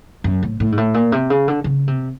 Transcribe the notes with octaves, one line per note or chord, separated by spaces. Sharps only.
F#2
A2
A2
G#2
A2
A#2
C3
C#3
D3
C#3
C3